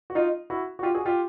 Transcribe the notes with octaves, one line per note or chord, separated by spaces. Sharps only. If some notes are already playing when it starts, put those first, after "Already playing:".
F#4
D#4 F4
E4 F#4
F#4
F4 G4
F#4 G#4
F4 G4